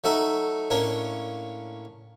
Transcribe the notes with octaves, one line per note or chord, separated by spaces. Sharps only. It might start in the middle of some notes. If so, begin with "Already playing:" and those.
F#3 A3 D#4 A4 E5
A2 A#3 C#4 D4